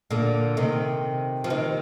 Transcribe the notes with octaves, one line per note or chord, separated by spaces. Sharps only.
A#2 D3
C3 D#3
F3
C3 D#3